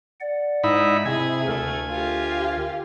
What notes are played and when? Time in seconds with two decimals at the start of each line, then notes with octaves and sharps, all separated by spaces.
0.21 D5 F#5
0.64 G#2 D#4 E4 B5
1.05 C3 E4 G#4 E5 G#5
1.48 D2 A3 A#4
1.90 F4 G4